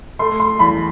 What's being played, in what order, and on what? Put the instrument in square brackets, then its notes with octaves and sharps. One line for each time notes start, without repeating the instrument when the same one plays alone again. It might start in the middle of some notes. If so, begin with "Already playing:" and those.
[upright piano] A3 C6
C6
E2 B5